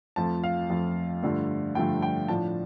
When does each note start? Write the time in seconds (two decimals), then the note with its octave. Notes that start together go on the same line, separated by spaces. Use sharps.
0.16 F2 F3 A3 F4 A5
0.44 F5
0.70 F2 F3 A3 F4
1.23 G2 D3 F3 A3 F4
1.75 G2 D3 F3 A3 F4 G5
2.02 G5
2.28 A2 F3 D4 F4 A5